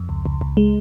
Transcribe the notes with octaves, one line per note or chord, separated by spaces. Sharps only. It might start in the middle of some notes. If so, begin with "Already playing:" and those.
Already playing: F2
C#2
C#2
C#2
G#3